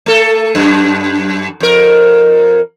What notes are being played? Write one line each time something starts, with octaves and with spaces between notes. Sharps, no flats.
A3 A4
F#2
F2 A#4